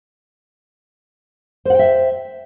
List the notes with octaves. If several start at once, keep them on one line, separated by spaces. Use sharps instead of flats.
C5 E5 F#5 G5